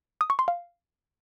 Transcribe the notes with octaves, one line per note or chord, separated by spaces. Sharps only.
D#6
C#6
C6
F5